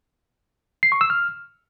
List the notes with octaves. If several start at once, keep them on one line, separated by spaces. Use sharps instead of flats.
C7
C#6
E6
F6